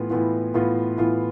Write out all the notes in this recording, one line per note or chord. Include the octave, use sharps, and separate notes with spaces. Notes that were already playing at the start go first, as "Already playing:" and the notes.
Already playing: A2 E3 B3 F4
A2 E3 B3 F4
A2 E3 B3 F4
A2 E3 B3 F4